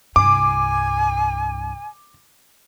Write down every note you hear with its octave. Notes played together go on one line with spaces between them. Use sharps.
C2 G2 G#5 D6